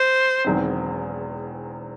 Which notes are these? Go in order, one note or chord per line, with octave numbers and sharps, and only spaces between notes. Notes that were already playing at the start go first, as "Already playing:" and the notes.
Already playing: C5
E1 E2 D#3 F#3 C4